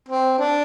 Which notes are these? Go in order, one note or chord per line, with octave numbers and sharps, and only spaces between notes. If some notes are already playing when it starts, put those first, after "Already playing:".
C4
D4